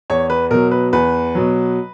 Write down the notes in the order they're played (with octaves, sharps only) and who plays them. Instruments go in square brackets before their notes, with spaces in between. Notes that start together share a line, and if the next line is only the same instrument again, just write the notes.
[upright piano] E2 C#5
B4
B2 F#3 A#4
B4
E2 B4
B2 F#3